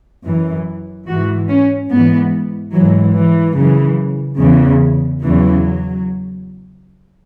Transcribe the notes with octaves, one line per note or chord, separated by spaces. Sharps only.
F#2 E3
G#2 E3 F#4
C#4
G#2 E3 B3
G#2 E3 F#3
E3
F#2 C#3 E3
E2 C#3 E3
E2 C#3 E3 F#3